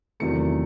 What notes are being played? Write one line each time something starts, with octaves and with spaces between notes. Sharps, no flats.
E2 C3 D#3 F#3 A3 C#7